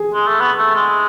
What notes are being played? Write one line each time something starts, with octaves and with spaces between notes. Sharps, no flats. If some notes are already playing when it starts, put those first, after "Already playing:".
Already playing: G#4
G#3
A3
B3
A3
G#3